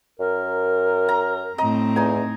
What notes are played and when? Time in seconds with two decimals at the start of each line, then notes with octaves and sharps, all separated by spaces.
0.19 F#2 A#4
1.09 A#5
1.58 A2 C4 D#5 A#5
1.96 E2 D#4 G#5